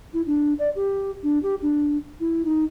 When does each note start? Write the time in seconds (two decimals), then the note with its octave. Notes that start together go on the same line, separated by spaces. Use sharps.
0.14 E4
0.27 D4
0.59 D5
0.75 G4
1.23 D4
1.43 G4
1.62 D4
2.20 E4
2.45 D#4